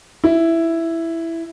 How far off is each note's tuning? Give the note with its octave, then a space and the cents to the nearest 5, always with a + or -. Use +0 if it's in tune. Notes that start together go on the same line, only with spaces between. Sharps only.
E4 +5